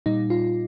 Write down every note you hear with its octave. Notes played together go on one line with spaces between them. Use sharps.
A#2 G3 D#4
F4